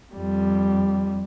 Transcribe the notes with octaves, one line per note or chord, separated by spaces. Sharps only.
F2 G3